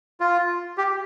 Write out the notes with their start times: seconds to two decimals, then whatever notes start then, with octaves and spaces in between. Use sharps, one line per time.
0.20 F4
0.78 G4